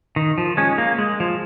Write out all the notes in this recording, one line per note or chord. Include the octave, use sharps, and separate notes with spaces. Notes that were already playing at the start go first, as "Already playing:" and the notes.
D#3
F3
G#3 C#4
A#3
G#3
F3